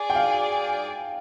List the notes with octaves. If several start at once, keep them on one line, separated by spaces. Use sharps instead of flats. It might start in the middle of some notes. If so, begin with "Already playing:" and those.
Already playing: G#4 D5 G#5
G5
F5